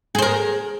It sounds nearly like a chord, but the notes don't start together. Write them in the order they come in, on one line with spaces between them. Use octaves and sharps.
G#4 C5 A#4